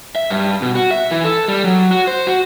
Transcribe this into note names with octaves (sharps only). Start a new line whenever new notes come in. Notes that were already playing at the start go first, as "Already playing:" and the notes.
E5
G2
B2
F#4
E5
E3
A4
G3
F#3
F#4
C5
F#4